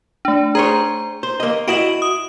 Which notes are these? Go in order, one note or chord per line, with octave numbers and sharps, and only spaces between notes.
A3 D4
G#4 C5 C#5 A#5
C5
A#3 D#5
E4 F#4 D#5 D7 E7 F#7
D#6